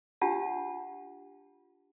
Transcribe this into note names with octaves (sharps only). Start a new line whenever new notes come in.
D4 F4 G4 F#5 A5